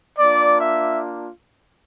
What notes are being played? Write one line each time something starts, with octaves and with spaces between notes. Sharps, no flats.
A#3 D4 F4 D5
E5